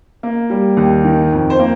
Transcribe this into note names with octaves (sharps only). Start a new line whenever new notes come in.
A#3
G3
D#2
D#3
F2
C5
A#3